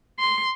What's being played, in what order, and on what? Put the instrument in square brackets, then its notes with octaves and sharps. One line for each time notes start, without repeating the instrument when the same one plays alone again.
[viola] C6